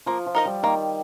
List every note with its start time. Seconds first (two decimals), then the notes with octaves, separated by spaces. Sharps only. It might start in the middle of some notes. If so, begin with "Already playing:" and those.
0.06 F3 A#3
0.26 F3
0.35 D#4 A#4 D#5
0.45 G3
0.63 D#3 A#3